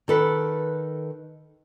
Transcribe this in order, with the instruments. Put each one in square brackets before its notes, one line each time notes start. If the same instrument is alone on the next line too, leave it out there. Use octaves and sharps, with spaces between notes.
[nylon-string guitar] D#3 A4 B4